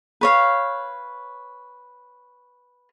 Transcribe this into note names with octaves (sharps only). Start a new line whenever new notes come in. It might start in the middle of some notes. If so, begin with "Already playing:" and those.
B4 C#5 F5